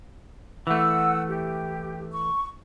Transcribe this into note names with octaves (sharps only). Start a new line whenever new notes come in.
E3 A3 F#5 E6
G4
C#6